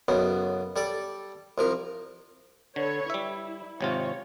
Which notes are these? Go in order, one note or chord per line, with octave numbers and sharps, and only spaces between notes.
B1 F#2 C#3 B3
G3 A4 D5
C2 F3 A#4
D3 A4 B4 C#5
G3 E4 E5
G#1 C3 F4 C#5